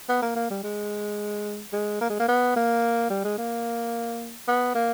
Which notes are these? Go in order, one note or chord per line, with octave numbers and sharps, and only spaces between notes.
B3
A#3
A#3
G3
G#3
G#3
A#3
G#3
A#3
B3
A#3
G3
G#3
A#3
B3
A#3